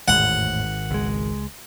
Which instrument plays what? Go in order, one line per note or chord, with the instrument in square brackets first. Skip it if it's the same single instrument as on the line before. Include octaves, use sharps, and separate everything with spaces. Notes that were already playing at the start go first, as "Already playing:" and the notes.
[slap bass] G#1 [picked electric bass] E2 A2 [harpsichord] F#5
[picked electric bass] C#2 G#3